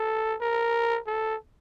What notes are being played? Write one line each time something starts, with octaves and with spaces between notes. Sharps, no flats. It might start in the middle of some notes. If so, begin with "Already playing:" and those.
Already playing: A4
A#4
A4